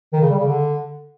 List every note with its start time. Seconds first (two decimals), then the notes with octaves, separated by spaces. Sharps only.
0.13 D#3
0.22 C#3
0.30 G3
0.39 C#3
0.47 D3